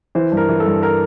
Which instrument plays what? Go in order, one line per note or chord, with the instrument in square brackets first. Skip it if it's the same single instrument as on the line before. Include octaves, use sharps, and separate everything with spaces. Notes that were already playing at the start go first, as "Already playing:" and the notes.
[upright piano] E3 C5
G2
A#4
E3
A4
G2
A#4